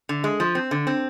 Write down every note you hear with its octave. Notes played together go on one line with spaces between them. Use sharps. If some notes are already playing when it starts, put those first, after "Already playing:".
D3
G#3
F3
C4
D3
C4